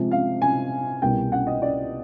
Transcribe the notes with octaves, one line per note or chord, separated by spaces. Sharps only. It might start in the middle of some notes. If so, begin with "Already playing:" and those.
Already playing: C3 F3 G#3
F5
G#5
C2 B2 G3 A#3 G5
F#5
D#5
D5